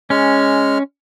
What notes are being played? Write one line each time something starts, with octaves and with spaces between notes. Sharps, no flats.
G#3 C#4 F6